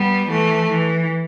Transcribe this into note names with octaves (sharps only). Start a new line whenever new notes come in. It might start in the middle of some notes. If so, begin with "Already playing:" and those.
Already playing: G3 B3
E3 A3
E3